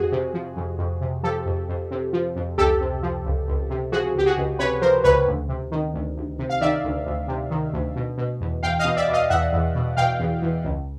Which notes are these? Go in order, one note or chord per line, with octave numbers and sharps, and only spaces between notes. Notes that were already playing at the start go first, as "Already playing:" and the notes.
Already playing: F2 F#4 G#4
C3
F3
F2
F2
C3
F3 G4 A4
F2
F2
C3
F3
F2
C#2 G4 A4
C3
F3
C#2
C#2
C3
F3 F#4 G#4
C#2 G4
F#4 G#4
C#2
C3 B4 C#5
F3 A#4 C5
C#2 B4 C#5
D2
C3
D#3
D2
D2
C3
F5
D#3 D5 E5
D2
D2
C3
D#3
D2
B2
B2
E2
E2 F5 G5
D#5 F5
B2
D5 E5
B2
D#5 F5
E2 E5 F#5
E2
B2
B2 F5 G5
E2
E2
C#2